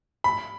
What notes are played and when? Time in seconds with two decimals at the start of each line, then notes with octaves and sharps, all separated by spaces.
0.24 B5